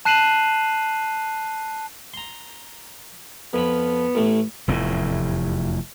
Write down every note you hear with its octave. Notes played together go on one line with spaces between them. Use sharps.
A5 F#6 C7 D#7 E7 F#7
A#5 C6
F2 F3 B3 B5
A1 A2 A3
F1 E2 A2